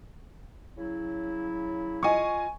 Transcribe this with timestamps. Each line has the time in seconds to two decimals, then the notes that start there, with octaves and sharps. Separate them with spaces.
0.77 C#3 F#3 E4
2.03 F4 D#5 G#5 C#6